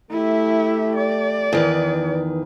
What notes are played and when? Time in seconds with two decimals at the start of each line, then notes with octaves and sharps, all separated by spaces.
0.11 A3 E4 G4 E5
0.95 D5
1.53 E2 D#3 B4